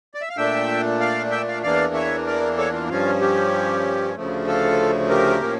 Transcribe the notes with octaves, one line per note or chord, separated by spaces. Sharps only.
D5
E5
F5
A#2 A3 D4 E5 G5
D5 F5
E5 G5
D5 F5
E2 E3 A#3 D4 D5 F5
C#5 E5
A#4 D5
A4 C#5
F4
G2 F3 C#4 F4
G4
D2 C#3 F3 A3
F4 A4
G4 A#4
A2 F3 A#3 C#4